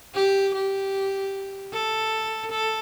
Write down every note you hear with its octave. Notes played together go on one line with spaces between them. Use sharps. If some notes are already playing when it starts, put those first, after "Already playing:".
G4
G4
A4
A4